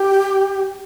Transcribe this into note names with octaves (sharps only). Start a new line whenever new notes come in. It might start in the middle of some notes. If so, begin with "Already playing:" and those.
Already playing: G4